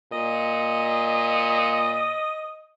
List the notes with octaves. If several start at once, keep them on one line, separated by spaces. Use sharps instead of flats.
A#2 D#5